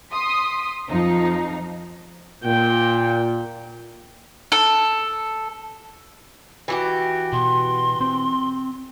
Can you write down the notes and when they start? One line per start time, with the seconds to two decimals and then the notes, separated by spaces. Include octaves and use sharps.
0.12 C6 D#6 B6
0.89 F2 F3 D#4
2.44 A#2 G5
4.52 A4
6.68 E3 F#4 G4
7.33 B2 C6
8.01 C4